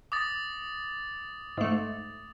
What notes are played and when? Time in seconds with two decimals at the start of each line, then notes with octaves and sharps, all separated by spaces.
0.12 D6 D#6 A6
1.58 G#2 A3